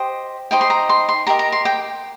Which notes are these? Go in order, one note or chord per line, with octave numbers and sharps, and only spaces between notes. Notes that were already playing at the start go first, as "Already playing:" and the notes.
Already playing: G4 C5 D#5
D#4 G4 C5 D#5 G5
C6
A#5
C6
C6
G4 A#4 D#5 A#5
A#5
C6
G5